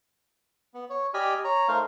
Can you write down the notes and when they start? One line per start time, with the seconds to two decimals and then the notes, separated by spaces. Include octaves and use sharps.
0.74 B3
0.90 C#5
1.14 G4 D5 D#5 G#5 B5 F6
1.45 C#5 A#5
1.68 A3 D#4 A#4 C5 F5